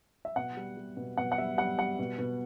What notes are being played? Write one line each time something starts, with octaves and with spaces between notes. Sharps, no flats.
E5
B2 F#5
G3
G3
B2
B2 F#5
F#5
G3 E5
G3 F#5
G3 F#5
B2
B2